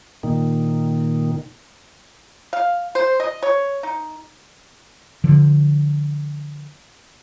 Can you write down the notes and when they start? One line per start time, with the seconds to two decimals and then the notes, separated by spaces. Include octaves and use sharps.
0.23 A#2 D#3
2.53 F5
2.95 C5
3.20 D#5
3.43 C#5
3.83 D#4
5.24 D3 F3